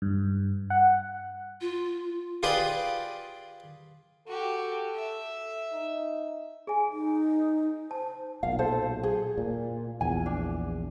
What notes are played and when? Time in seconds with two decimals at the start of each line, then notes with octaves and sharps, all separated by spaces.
0.02 G2
0.70 F#5
1.61 F4
2.43 F4 G4 G#4 B4 D5 G5
4.27 F#4 G4 A4
4.95 E5
5.73 D#4
6.67 G#4 G#5
6.92 D#4
7.91 C5 A5
8.43 B1 A#2 F5
8.59 A4 C5
9.03 G#4
9.38 A#2
10.01 A#1 E2 G#5
10.26 D4